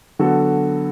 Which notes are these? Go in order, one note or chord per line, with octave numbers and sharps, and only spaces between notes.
D3 F#3 B3 F#4 A4